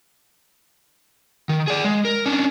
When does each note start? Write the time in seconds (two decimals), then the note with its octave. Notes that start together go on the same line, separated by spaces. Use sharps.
1.49 D#3
1.68 G#4 D5
1.84 G#3
2.05 A#4
2.26 C#4 D4